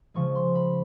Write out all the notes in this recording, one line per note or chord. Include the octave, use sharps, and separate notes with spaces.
C#3 F3 G#3 C#6
C6
B5